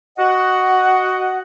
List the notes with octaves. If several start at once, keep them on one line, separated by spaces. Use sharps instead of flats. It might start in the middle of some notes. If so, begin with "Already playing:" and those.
F#4 D#5 F#5